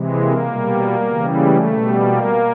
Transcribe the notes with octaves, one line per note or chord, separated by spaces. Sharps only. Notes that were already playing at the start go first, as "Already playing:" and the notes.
Already playing: C3 E3 G#3
A#3
B2 G3
C#3 E3 G3
A3
B2 G3
A#3